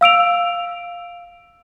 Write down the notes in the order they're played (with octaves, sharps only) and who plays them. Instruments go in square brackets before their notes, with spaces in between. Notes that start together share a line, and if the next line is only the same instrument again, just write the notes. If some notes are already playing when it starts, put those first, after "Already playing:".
[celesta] F5 E6 D7 F7